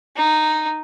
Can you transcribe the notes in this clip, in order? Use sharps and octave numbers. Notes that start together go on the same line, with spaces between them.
D#4